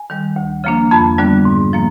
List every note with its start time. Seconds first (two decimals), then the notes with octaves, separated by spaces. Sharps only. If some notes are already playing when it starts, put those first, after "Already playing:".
Already playing: G#5
0.10 D#3 G3
0.36 D2
0.64 C#3 F3 A#3 D4
0.91 F2 A5 B5
1.18 D3 G3 B3 D4
1.45 G#2
1.73 F3 A#3